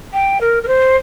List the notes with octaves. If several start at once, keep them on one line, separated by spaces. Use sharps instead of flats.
G5
A#4
A#4
C5